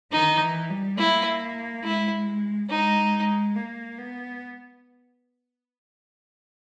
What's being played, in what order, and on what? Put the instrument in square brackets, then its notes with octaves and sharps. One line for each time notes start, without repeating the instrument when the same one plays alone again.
[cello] D#3 [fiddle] D#4
[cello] E3
G3
[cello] A#3 [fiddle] E4
[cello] G#3 [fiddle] E4
[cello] G#3 [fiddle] D#4
[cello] A#3
B3